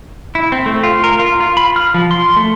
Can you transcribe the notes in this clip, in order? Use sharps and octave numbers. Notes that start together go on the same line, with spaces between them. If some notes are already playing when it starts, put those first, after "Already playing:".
E4
C4
A3
F4
A#4
F4
F4
B5
F6
F3
C6
A3